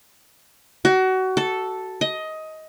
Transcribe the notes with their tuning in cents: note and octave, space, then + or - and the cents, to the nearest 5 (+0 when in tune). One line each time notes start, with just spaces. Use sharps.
F#4 +25
A4 +0
D#5 +15